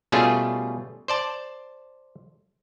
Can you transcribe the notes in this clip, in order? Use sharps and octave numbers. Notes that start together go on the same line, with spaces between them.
B2 G3 A3 C#4 F4 G#4
C5 D5 A5